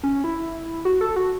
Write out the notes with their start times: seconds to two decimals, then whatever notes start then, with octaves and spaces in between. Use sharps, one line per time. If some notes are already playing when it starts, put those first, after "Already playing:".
0.03 C#4
0.24 E4
0.85 F#4
1.01 A4
1.16 F#4